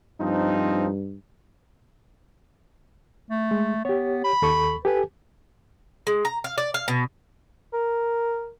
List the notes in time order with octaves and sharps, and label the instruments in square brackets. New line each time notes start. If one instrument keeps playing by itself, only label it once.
[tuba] G2 [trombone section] F3 C4 D#4
[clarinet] A3
[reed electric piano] G#3
[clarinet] B3 [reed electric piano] G4 C#5
[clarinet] B5
[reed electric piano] D#2 A4 C#6
[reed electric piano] G4 A4 G#5 [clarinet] B4
[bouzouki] G#3
A#5
F5
D5
F5
B2
[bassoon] A#4